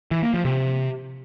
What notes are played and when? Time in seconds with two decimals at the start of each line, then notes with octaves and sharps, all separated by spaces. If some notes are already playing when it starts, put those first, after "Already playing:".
0.11 E3
0.22 A#3
0.34 F3
0.45 C3